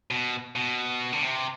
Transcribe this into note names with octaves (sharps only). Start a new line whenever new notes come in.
B2
B2
D3
C3